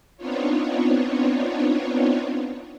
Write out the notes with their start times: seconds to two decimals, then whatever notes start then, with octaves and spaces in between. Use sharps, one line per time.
0.17 B3 C4 D4 D#4 F4 C#5